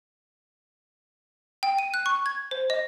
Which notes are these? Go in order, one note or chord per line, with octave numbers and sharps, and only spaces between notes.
G5
D#7
F#6
C#6
G#6
C5
D#5